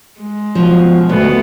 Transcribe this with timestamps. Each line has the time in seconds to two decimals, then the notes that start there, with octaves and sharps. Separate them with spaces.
0.20 G#3
0.55 B2 F3
1.09 D2 B2 A3 B3